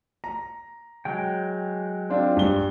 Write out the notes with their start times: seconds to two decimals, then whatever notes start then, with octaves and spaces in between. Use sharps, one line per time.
0.24 A#5
1.05 F#3 G#3 G5
2.10 C4 D4 F4
2.37 G2 G7